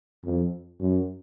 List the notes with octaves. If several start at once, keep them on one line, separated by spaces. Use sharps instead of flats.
F2
F#2